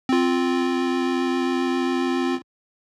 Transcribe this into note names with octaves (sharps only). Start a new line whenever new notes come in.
C4 F4